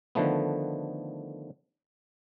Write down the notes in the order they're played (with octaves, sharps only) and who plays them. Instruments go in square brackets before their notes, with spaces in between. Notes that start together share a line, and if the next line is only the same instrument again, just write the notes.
[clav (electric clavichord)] D3 D#3 F3 A3 B3